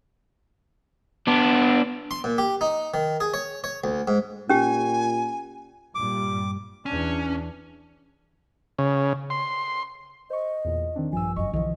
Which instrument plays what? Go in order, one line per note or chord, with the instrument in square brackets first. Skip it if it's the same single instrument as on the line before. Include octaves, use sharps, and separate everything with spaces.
[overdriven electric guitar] B3 D4
[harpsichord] C6
A#2
G4
D#4
D#3
G#4
C#5
C#5
D2
G#2
[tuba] A#2 [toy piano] C#4 G4 [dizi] G#5
[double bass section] G2 A#2 G3 [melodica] D6
[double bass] E2 D4 [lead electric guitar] C#4
[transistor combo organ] C#3
C6
[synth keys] C5 C#6 [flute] D#5
[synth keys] E2 A#2
D#3 C4 D4
[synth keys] A#1 G2 E6 [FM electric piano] F3 [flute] G#5
[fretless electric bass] F1 F#2 [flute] D#5 [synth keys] C#6
[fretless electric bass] B1 D3 F3 [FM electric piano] E3 [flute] D#5